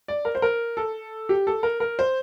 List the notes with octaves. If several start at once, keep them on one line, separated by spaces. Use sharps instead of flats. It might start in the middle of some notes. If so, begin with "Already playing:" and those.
D5
A#4
C5
A#4
A4
G4
A4
A#4
A#4
C5